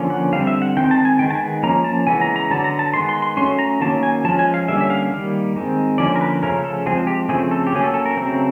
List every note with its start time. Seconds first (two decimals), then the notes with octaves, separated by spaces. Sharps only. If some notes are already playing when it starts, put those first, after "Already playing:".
Already playing: D3 F3 A#3 C#4
0.10 F#5
0.32 D3 G3 C4 F5
0.47 E5
0.62 F#5
0.77 D#3 G#3 C4 G5
0.91 A5
1.05 G#5
1.19 D#3 G#3 B3 G5
1.30 A5
1.34 G#5
1.63 F3 A#3 C#4 A#5
1.84 A5
2.07 C#3 E3 G#3 B3 G#5
2.21 A#5
2.36 A#5
2.50 D3 F#3 B3 A5
2.64 A#5
2.79 A5
2.94 D#3 G#3 B3 C6
3.09 C6
3.22 C6
3.37 F#3 A3 C#4 C6
3.59 A#5
3.80 D#3 F#3 A#3 C#4 A5
4.03 G#5
4.25 F3 G#3 C#4 A5
4.39 G#5
4.54 F5
4.68 D3 G3 A#3 C#4 E5
4.81 E5
4.90 F5
5.12 D#3 G3 A#3
5.56 D#3 G#3 C4
5.98 D3 F3 A#3 C#4 D5
6.16 A#4
6.21 B4
6.43 C#3 F3 A3 C#4 A#4
6.64 A4
6.86 F3 G#3 C4 G#4
7.07 G4
7.29 C#3 F3 A3 C4 G#4
7.51 A4
7.67 G4
7.72 F#3 A#3 C#4 G#4
7.84 A4
7.94 A4
8.06 A#4
8.17 C#3 F#3 A3 C4